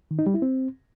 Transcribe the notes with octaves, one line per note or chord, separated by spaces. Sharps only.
D#3
D#4
G3
E4
C4